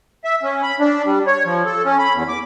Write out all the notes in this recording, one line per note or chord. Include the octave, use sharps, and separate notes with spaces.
E5
C#4
B5
D4
G3
C#5
F3
A4
C#4
B5
E2
D6